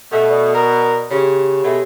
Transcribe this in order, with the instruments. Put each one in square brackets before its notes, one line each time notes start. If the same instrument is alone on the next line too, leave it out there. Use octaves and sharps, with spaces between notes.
[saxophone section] B2 [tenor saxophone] A3
[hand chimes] D5 D#6
[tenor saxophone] A#4
[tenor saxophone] C#3 [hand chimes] G4 C#5
[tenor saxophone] B2 [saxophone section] G#3 A3